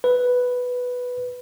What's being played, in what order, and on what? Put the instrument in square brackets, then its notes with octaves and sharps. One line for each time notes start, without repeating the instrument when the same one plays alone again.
[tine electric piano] B4